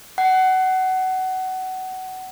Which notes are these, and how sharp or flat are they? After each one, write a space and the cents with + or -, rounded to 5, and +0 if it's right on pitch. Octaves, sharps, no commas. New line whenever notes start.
F#5 +20